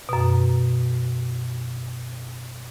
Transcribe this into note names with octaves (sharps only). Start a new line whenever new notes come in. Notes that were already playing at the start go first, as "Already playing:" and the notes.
F#2 B2